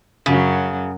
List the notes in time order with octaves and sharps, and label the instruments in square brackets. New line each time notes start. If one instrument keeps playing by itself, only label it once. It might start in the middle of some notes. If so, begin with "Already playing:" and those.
[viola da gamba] F#2 F#3 [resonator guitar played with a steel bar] C#3